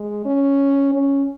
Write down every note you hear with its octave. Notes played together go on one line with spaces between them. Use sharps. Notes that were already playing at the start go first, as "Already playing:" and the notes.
Already playing: G#3
C#4
C#4